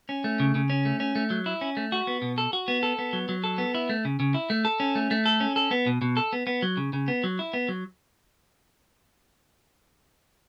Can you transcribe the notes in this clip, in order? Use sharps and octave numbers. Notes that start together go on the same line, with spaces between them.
C#4
A3
C#3
C#3
C#4
A3
C#4
A3
F#3
E4
C#4
A3
F#4
B3
B2
A4
F#4
B3
A4
B3
F#3
F#3
A4
B3
E4
A3
C#3
C#3
E4
A3
A4
C#4
A3
A3
A4
C#4
A4
B3
B2
B2
A4
B3
B3
F#3
C#3
C#3
B3
F#3
E4
B3
F#3